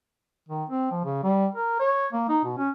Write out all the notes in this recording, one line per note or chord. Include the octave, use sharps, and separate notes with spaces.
D#3
C4
F3
C#3
G3
A#4
C#5
A#3
D#4
B2
C#4